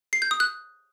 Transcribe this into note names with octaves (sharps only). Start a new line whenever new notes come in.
C7
G6
D#6
F#6